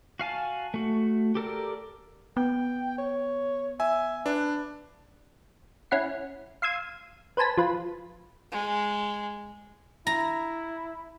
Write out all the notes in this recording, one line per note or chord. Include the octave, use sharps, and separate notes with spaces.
F#4 F5 G#5 A5
A3 F#4
G4 A4 A#4 D5
B3 G5
C#5
E5 G#5
D4 B4
C#4 E4 F#5 C7
F5 C6 E6 G#6 D#7
B4 C5 G#5 A5 B6
F3 F4 B4
G#3
E4 A#5